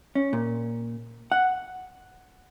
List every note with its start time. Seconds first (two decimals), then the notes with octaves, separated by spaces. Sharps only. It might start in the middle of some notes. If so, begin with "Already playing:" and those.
0.15 C#4
0.33 A#2
1.32 F#5